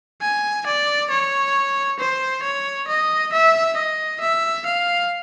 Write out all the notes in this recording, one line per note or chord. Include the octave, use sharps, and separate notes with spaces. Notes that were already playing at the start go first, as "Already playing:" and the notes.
G#5
D5
C#5
C5
C#5
D#5
E5
D#5
E5
F5